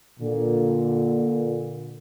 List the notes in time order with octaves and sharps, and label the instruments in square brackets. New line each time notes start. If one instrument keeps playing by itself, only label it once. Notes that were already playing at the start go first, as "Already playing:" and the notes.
[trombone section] A#2 D3